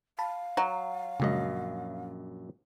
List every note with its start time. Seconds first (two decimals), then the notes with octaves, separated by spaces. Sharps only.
0.19 F5 A5 B5
0.57 F#3 F#5 A#5
1.20 A#1 F#2 C#3 G#3 D#5